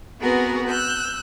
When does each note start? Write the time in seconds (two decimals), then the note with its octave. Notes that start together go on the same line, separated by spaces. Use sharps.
0.20 B3 C4 F#4 G#4 A#4 B4
0.67 E6 F#6 G6